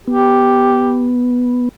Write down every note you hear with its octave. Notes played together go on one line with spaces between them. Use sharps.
B3 G4